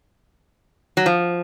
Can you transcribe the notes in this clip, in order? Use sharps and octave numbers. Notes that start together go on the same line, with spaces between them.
F#3
F3